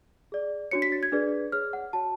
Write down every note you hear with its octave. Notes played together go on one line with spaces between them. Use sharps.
G#4 D5
D4 F#4 C#5 C#7
B6
A6
G#6
D4 G#4 B4 D5
G#4 C#5 F6
F#5
F#4 C#5 A5